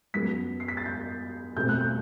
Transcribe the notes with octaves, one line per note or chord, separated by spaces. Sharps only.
F#2 F#3 B3 B6
C7
B6
A6
G6
B2 A3 C4 G6
F#6
G6